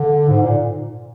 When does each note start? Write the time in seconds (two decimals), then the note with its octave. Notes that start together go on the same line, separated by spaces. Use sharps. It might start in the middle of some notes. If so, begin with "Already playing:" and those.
Already playing: D3
0.29 G#2
0.43 A#2